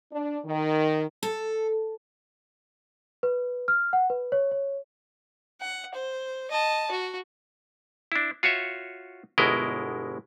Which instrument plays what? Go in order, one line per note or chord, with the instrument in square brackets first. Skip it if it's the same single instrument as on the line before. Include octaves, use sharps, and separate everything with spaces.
[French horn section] D4
D#3
[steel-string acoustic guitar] A4
[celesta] B4
F6
F#5
B4
C#5
C#5
[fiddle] F#5
C5
D#5 A5
F#4
[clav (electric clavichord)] D4 E4
F4 F#4 C#5 E5
G1 B2 G#3 E4 A#4 D#5